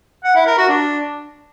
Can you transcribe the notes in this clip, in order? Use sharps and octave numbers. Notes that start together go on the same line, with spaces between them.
F#5
E4
A#4
F#4
D4